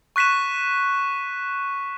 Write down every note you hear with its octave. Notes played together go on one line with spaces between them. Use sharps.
C#6 F#6 B6 D#7 E7